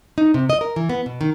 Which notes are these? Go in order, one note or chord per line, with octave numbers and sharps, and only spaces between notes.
D#4
C3
D#5
A#4
E3
B3
B2
D#3